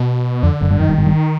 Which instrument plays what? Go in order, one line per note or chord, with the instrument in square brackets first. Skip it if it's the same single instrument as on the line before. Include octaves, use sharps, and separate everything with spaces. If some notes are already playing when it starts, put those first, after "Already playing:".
Already playing: [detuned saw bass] B2
[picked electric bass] F2 [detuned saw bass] D3
[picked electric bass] F#1 F#2
G1 G2
[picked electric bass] F#1 F#2 [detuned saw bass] D#3
[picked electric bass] G1 G2
G#1 G#2
G1 G2